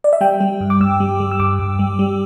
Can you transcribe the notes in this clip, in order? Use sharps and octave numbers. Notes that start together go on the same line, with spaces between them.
D5
E5
G3 G5
G3
G2
D6
G2 E6
G3
G3
E6
G2 D6
G2
G3
G3